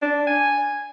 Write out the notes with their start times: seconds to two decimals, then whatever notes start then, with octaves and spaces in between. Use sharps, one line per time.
0.02 D4
0.27 G#5